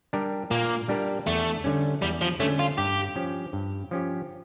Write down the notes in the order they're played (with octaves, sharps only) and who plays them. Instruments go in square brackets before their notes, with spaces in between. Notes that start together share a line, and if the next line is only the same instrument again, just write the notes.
[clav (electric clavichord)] G3 D4 G4 A#4
[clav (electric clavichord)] A#2 [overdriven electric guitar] A#3
[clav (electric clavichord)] G3 D4 G4 A#4
[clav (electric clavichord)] E2 [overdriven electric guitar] A3
[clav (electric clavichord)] D3 G3 C#4
[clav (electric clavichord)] E2 [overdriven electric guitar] G3
[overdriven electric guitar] F3
[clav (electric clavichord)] D3 G3 C#4 [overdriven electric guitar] A3
[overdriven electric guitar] F4
[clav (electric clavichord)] G2 [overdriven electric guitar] G4
[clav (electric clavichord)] F3 C#4 G4
G2
F3 C#4 G4